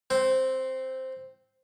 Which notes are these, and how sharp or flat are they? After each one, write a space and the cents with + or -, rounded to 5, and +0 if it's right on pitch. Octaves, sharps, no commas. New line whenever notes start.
C4 +0 C5 +0 G5 -40